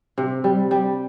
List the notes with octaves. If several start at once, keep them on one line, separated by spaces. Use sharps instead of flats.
C3
G3
G3